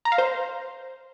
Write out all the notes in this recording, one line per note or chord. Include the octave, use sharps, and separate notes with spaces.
A#5
F5
C5